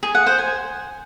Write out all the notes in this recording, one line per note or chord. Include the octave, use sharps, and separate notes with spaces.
G#4
F#5
C5
G#5